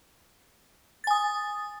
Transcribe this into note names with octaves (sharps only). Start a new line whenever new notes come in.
G#5 D#6 A6